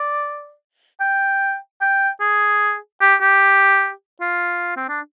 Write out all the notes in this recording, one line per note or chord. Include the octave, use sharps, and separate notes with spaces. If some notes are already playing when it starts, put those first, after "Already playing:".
Already playing: D5
G5
G5
G#4
G4
G4
F4
C4
D4